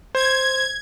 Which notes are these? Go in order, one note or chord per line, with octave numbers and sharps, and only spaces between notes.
C5 G#6